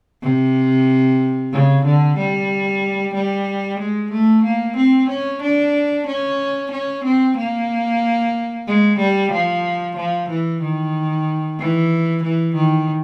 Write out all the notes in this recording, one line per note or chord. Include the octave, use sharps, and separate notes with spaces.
C3
C#3
D3
G3
G3
G#3
A3
A#3
C4
C#4
D4
C#4
C#4
C4
A#3
G#3
G3
F3
F3
E3
D#3
E3
E3
D#3